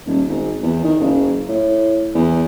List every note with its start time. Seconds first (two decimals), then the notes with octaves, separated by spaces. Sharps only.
0.06 D#1
0.28 G#1
0.63 E2
0.84 D#3
1.00 F#1
1.49 A2
2.14 E2